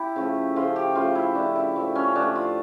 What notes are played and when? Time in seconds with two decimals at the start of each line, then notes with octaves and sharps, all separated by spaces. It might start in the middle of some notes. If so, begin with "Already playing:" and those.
Already playing: E4 G4
0.16 C#3 F3 A3
0.56 C#3 F3 A3 F4
0.76 G4
0.95 C#3 F3 A3 F4
1.15 E4
1.35 C#3 F3 A3 D4
1.55 E4
1.76 A2 F3 A3
1.95 C#4
2.15 A2 F3 A3 D4
2.35 F4